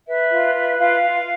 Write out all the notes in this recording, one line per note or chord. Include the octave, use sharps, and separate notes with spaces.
B4 E5
F4
B4
F4 F5
F4